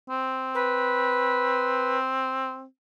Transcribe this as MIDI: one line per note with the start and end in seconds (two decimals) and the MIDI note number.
0.10 2.64 60
0.54 1.97 71